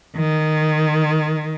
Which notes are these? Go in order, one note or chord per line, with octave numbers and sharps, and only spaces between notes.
D#3